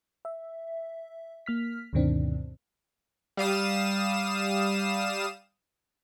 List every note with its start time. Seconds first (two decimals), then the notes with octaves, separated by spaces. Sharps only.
0.25 E5
1.46 A#3 F6 B6
1.93 D2 G2 B2 D#3 C4 D4
3.37 G3 F5 D#6 E7